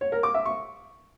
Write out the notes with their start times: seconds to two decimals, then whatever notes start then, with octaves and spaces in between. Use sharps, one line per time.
0.01 C#5
0.12 A#4
0.23 D6
0.34 E5
0.46 C#6